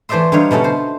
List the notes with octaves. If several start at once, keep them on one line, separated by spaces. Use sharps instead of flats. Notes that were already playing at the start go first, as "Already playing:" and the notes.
E3 A3 C5 D5 E5 C6
D3 G3 D#4 C#5 F5
B2 A3 C#4 A4 F#5
C5